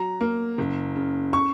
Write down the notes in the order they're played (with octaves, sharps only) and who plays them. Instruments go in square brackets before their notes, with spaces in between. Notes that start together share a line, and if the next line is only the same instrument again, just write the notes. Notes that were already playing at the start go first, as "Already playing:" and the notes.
Already playing: [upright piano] F#3 A#5
A#3
F#1
C#3
C#6